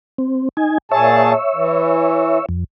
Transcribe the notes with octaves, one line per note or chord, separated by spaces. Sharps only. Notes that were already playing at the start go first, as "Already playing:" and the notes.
C4
D#4 G#5
A#2 G#4 C#5 E5 A5
E3
F2